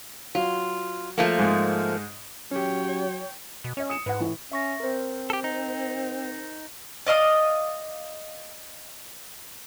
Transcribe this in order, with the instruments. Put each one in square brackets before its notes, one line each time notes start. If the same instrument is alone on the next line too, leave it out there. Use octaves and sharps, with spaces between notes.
[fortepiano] F#3 [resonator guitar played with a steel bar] F4
[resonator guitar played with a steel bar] F3 A3 A#3
[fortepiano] G#2 G#3
[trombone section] F#3 [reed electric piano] C#4 G4 [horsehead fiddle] C#5 G5
[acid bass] B2
[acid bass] C#4 [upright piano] C#5 D#5
[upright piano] D#6 C#7 E7
[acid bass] G#2 [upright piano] B4 F#5
[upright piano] A2 E3
[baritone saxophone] C#4 [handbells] E5 C#6 A#6
[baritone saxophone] C4 [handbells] A#4 C5
[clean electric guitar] G4 A4
D#4
[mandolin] D5 D#5 F5 D#6